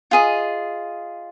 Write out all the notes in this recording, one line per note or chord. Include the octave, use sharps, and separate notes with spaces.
F4 G#4 D#5